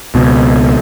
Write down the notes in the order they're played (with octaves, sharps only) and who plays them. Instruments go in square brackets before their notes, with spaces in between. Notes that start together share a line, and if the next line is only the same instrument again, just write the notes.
[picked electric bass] C#2 B2